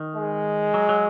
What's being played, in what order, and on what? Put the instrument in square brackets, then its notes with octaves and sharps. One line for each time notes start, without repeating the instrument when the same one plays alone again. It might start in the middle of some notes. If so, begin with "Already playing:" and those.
Already playing: [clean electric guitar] D#3
[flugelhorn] G#3
[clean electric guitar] F#3
F#3